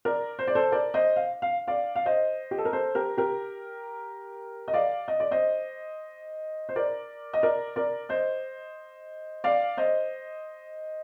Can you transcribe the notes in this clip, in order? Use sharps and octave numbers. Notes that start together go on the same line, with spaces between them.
A#4 D5
C5
D5
A4 C5
A#4 D5
C5 D#5
F5
F5
D5 F5
F5
C5 D#5
G4
A4
A#4
A4 C5
G4 A#4
G4 A#4
D#5
D5 F5
D#5
D5
C5 D#5
C5
A#4 D5
D#5
A#4 D5
A#4 D5
C5 D#5
D5 F5
C5 D#5